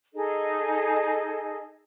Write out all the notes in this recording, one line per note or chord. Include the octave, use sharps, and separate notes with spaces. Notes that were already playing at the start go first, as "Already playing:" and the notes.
D#4 G#4 A4 D#5